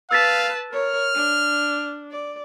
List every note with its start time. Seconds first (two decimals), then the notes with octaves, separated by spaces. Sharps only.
0.11 B4 F5 A5 E6 A6 B6
0.71 A#4 C#5 F6
1.15 D4
2.11 D5